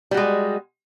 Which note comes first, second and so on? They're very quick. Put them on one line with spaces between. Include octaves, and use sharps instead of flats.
G3 F#4 G#3